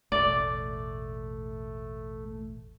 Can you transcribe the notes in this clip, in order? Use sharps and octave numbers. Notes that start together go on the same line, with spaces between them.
E1 A1 A3 D5